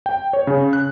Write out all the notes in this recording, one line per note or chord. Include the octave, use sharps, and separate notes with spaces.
G5
C#5
C#3
F#6